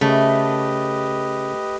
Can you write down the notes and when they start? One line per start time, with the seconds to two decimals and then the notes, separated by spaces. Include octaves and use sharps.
0.01 C#3 A3 G4 B4 D#5